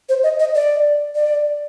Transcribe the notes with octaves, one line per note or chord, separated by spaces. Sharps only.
C5
D#5
D#5
D5
D5